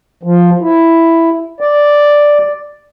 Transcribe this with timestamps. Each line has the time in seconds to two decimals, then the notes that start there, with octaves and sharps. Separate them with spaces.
0.23 F3
0.61 E4
1.60 D5